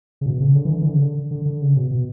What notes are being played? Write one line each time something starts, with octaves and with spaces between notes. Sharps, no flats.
C#3
B2
C#3
D3
E3
D3
E3
D3
C#3
D3
D3
D3
C#3
B2
B2